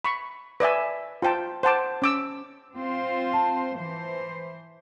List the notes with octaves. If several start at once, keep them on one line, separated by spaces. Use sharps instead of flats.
B5 C#6
B4 D5 E5 G#5
F4 C5 G5 A5
C5 F#5 A5 D6
C#4 D6 E6
C4 F4 C5
A5
E3 C5